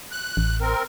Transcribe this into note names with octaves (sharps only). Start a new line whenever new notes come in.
F#6
A1
C4 A#4